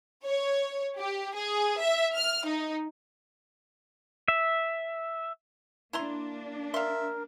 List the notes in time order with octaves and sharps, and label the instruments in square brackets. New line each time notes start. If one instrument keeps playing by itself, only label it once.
[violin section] C#5
G4
G#4
E5
F6
D#4
[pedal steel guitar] E5
[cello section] A#3 D4 [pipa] E4 A#5 C6
[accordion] A#4 [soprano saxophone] E5 [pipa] F5 C6